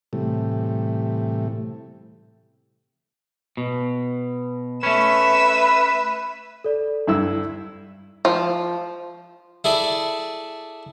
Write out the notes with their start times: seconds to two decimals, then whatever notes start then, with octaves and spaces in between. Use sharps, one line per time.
0.13 A2 C3 E3 G3 A3
3.57 B2
4.83 A3 C#4 B4 E5 E6
6.64 A4 D5
7.07 G2 E4 E6
8.25 F3
9.64 E4 G#4 A4 D5